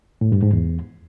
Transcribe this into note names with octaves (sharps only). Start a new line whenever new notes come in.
A2
G2
G#2
E2